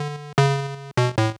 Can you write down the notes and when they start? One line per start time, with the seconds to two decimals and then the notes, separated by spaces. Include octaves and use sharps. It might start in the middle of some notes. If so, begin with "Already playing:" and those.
Already playing: D3
0.38 C#3
0.97 B2
1.18 A2